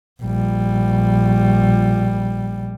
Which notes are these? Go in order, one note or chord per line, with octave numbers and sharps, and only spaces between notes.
A#1 G3